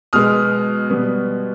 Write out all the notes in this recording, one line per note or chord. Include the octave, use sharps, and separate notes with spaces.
B2 G#3 B3 D#6 F6
B2 G3 B3